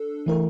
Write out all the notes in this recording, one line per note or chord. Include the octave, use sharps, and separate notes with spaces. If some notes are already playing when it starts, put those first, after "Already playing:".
Already playing: D4 A4
E3 A3 E4 A#4